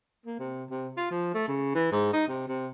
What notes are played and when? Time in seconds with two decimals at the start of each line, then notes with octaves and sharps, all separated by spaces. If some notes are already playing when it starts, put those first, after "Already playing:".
0.26 A#3
0.39 C3
0.70 C3
0.97 F4
1.11 F3
1.34 A3
1.48 C#3
1.75 E3
1.92 G#2
2.13 D#4
2.28 C3
2.48 C3